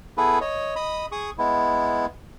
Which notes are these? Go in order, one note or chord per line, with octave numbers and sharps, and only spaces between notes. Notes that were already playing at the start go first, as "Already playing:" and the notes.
B3 E4 G#4 A4 B4
C#5 D#5
D#5 B5 D#6
G#4 C#6 D#6
G#3 B3 E4